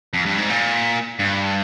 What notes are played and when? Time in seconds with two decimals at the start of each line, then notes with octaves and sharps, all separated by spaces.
0.13 F2
0.26 G2
0.38 G#2
0.50 A#2
1.19 G2